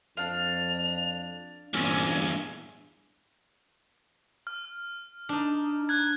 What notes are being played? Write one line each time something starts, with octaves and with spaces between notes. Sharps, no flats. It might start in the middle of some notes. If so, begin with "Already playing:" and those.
F2 D4 F5 F7
E2 G2 A#2 C4 C#4 G#5
F6
D4 D#4
F#6 G#6